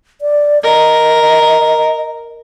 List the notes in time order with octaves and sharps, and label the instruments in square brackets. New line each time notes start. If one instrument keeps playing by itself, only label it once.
[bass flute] D5
[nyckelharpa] A#4 [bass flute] D#5